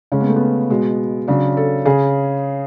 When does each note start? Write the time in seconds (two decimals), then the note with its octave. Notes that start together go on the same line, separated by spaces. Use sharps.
0.12 C#3 G#3 C#4
0.20 B3
0.28 A3
0.36 B3
0.70 B2 G#3
1.28 C#3 F#3 D4
1.57 A4
1.85 C#3 G#4